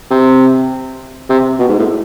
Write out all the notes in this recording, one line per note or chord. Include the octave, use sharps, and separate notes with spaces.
C3
C3
B2
G#2
A2